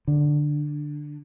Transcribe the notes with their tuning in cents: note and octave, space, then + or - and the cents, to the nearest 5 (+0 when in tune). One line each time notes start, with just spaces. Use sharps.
D3 +10